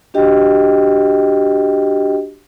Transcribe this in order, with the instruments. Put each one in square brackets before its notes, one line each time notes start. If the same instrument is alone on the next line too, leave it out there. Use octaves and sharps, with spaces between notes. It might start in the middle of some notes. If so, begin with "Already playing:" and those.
[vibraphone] D4 F#4 G4 D#5 G5